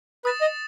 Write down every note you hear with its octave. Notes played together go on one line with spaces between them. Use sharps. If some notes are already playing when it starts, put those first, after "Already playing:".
B4 D#6 A6 E7
D#5